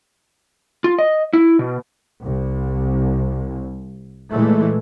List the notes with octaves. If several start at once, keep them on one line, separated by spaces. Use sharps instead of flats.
F4
D#5
E4
B2
C2
A#2 E3 G#3 A3